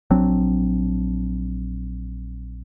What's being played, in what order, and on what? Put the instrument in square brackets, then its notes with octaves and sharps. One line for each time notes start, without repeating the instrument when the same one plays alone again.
[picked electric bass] A#1 F#3 C4 D4